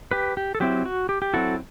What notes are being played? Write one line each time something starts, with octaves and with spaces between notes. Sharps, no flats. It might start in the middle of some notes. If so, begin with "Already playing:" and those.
G4 B4
G4
A4
F#3 C4 E4 G4
F#4
G4
G4
F#3 C4 E4 F#4 A4